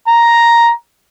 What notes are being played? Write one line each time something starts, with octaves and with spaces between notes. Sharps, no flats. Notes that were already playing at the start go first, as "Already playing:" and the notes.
A#5